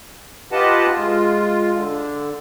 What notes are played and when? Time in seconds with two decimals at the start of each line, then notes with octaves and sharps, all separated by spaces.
0.52 F4 G4 B4 D#5 F#5 A5
0.96 G#3 F4
1.74 D3